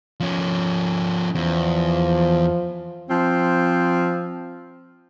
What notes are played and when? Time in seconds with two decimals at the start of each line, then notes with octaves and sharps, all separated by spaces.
0.20 F3 C#4
1.35 E2 F3
3.09 F3 C4